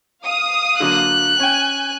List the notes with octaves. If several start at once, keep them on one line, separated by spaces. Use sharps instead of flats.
F5 D#6
D3 F#3 A#3 F#6
C#4 G5 G#5